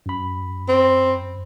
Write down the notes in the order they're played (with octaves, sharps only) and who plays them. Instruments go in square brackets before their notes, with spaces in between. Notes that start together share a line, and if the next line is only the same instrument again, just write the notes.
[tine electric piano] F#2 B5
[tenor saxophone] C4